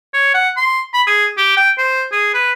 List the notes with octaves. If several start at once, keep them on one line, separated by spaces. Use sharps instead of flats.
C#5
F#5
C6
B5
G#4
G4
G5
C5
G#4
B4